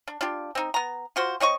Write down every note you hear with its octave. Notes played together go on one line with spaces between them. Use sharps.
D4
D4 F4 G4
C4 D#4
B3 A#5
F4 F#4 C5
C4 C#5 D#5 C#6